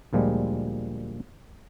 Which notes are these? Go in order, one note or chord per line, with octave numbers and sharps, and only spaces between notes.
D2 A#2 F3 G3 G#3